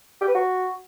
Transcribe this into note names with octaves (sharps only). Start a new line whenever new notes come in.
G4
B4
F#4